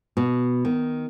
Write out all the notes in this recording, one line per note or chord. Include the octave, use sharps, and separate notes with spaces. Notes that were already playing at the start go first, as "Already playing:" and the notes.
B2
D#3